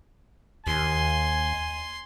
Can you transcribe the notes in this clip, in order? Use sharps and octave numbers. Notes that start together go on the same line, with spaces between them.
D#2 G#5 C6